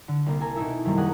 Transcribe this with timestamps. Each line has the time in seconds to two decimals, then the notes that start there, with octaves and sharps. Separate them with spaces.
0.08 D3
0.26 C2 A#3
0.40 A4 G#5 A#5
0.56 B2 D#4 E4
0.85 F#2 C3 D#3 G3 A#3
0.97 D#1 A#3 G#4 F#5 D#6